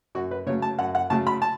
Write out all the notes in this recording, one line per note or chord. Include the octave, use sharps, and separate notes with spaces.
F#2 F#4
B4
C#3 F#3 A3 C#5
A5
F#2 F#5
F#5
C#3 F#3 A3 A5
B5
A5